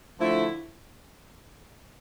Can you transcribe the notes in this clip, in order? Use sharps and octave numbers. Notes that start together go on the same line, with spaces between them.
D3 F3 A3 E4